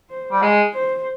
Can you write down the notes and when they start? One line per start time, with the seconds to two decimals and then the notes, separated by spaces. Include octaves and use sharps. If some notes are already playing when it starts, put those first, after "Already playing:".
0.10 C5
0.32 G3
0.42 G#3
0.74 C5